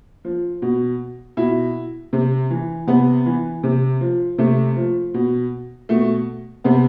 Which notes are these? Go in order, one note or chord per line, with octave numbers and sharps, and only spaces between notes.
F3
B2
B2 E4
C3
E3
C3 B3
E3
C3
F3
C3 A3
F3
B2
B2 A3
C3 B3